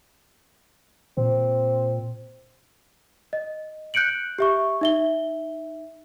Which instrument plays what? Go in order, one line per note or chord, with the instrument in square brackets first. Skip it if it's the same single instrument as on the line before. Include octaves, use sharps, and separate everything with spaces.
[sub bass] A#2 [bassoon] C4
[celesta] D#5
F#6 G6 C#7 D7 F#7
G4 E5 C#6
D#4 E5 G7